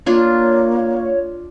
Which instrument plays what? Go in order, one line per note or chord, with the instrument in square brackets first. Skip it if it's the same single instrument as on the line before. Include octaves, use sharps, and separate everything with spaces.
[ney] A#3 [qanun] D4 F4 [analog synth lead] C#5